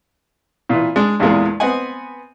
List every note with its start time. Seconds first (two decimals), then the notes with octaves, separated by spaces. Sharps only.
0.69 A#2 E3
0.96 G#3 D4
1.20 E2 G2 A#2 E3 G#3 A#3
1.60 B3 C4 D#5 F#5 G#5